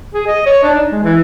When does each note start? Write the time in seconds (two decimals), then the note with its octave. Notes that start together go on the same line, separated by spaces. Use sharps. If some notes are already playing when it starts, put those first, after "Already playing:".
0.14 G#4
0.27 D#5
0.46 C#5
0.63 D4
0.75 D#4
0.92 G#3
1.03 E3